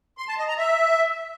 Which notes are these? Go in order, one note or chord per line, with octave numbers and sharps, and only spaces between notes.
C6
A5
D#5
A#5
E5